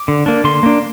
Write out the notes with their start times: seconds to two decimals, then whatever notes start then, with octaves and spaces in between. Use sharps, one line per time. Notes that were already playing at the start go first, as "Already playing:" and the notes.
Already playing: D6
0.08 D3
0.26 A#3 D4
0.44 D3 C6
0.63 A#3 D4